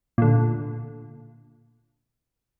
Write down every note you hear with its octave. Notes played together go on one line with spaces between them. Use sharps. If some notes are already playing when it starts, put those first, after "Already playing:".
A#2 D3